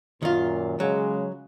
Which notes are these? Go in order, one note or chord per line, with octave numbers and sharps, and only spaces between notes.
F#2 A#2 D#3 F4
C#3 F#3 G#3